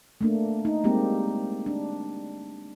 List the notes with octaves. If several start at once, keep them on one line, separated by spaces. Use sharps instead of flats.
A3 A#3 D4
D#4
G3 G#3 A#3 C4 G4
D4